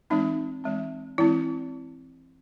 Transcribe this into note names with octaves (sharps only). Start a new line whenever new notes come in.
E3 G#3 C4 D#4
E3 G#3 C4
E3 G#3 C4 E4